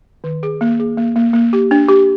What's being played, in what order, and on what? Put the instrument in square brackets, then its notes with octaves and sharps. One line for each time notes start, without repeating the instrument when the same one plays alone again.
[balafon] D#3
G#4
A#3
G#4
A#3
A#3
A#3
G4
D4
G4